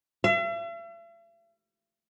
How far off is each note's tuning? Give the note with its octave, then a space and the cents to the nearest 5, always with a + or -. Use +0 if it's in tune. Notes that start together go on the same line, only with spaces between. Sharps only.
E5 +45